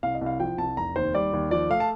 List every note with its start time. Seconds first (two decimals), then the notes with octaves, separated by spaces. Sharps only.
0.03 C2 F5
0.15 D#5
0.21 C2
0.26 F5
0.40 F3 G5
0.58 C2 A5
0.77 F1 A#5
0.96 D#2 C5
1.14 G3 D5
1.33 D#2
1.51 F3 D5
1.70 A3 F5
1.80 A5